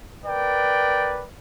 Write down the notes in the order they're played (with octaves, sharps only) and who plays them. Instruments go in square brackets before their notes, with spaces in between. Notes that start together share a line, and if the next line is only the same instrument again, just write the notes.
[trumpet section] A#4 B4 D5 G5